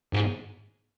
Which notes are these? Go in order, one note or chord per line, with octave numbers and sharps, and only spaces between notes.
G#2